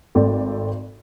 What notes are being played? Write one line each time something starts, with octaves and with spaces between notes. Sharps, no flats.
G#1 A3 C4 D5